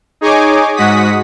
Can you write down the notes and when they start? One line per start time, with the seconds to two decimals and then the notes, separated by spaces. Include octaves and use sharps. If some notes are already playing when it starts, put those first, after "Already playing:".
0.21 D#4 G#4 C#5 D#5 G#5 D6
0.76 G#2 G#3 F#4 F#5 D#6 B6